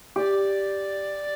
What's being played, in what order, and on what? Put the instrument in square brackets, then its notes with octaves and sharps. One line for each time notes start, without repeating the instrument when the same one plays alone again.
[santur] G4 [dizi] D5